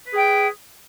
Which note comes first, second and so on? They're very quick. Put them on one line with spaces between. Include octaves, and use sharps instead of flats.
B4 G#4 G5